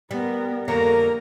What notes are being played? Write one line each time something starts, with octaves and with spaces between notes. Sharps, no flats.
G3 B3 A#4
F2 D3 A#3 A#4 C#5 A#5